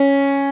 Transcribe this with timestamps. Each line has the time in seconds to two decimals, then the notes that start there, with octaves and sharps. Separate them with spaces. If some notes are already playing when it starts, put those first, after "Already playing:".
Already playing: C#4